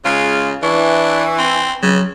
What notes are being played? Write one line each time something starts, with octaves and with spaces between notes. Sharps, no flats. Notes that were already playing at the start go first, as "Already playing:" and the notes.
C#3 G#3 F4
E3 D4 C#6
C4
C#3 F#3